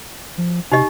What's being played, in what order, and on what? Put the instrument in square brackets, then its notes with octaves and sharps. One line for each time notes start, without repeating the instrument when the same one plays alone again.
[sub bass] F3
[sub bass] C3 [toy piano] D#4 G4 D#5